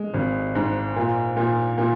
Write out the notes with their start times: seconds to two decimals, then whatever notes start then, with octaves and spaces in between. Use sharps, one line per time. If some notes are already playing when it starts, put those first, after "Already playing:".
Already playing: G#3
0.14 G#1
0.55 G#2
0.96 A#2
1.37 A#2
1.78 A#2